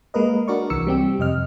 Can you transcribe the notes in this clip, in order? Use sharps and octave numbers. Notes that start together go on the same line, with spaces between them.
G#3 A#3 A#4 B4 D#5
D4 F#4 A#4 D5 C#6
C2 E3 E6 C#7
G3 C4 G4
F2 C3 D#5 F6